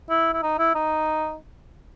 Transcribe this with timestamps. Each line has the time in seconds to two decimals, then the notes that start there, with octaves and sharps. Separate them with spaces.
0.10 E4
0.33 E4
0.43 D#4
0.59 E4
0.75 D#4